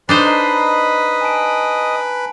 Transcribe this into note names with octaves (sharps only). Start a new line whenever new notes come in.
D4 D#4 B4 C5 B5 C7
D#5 A#5 C6 F#7
G#5 A5 D7